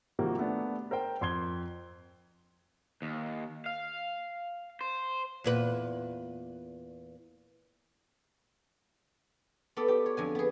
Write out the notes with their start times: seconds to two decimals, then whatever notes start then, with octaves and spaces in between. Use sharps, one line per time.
0.19 C3 D#3 F3 G3 A#3 F#4
0.38 A3 B3 D4
0.91 A#4 C5 G5
1.21 F2 C6 G#6 G7
3.02 D#2
3.66 F5
4.81 C5
5.44 E2 A#2 B4
9.77 B3 A4 D5
9.88 G4
10.06 C#5
10.17 F2 D3 G#5
10.35 B3 G#4